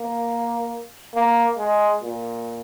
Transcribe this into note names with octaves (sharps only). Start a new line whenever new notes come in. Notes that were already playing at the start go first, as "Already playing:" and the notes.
Already playing: A#3
A#3
G#3
A#2